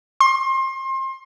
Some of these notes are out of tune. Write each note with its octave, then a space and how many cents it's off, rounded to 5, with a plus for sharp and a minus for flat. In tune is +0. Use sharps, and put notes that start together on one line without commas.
C6 +30